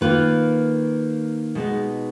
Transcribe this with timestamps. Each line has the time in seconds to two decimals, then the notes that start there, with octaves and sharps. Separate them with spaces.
0.01 D#3 A#3 F4 B4
1.55 B2 G#3 B3 D#4